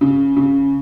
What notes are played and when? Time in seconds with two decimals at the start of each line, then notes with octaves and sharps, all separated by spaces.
0.01 C#3
0.36 C#3